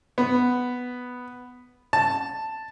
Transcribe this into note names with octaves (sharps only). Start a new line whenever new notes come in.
B3
A5